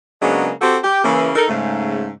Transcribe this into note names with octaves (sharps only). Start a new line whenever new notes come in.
C#3 F#3 G#3 A#3 B3 D4
C4 F#4 G4 A4
G4
C#3 E3 A#3
D#4 A4 A#4
G#2 C#3 A3